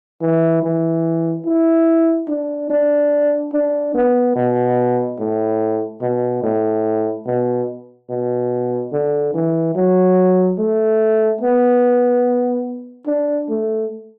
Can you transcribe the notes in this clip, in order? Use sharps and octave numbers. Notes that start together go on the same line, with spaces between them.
E3
E3
E4
D4
D4
D4
B3
B2
A2
B2
A2
B2
B2
D3
E3
F#3
A3
B3
D4
A3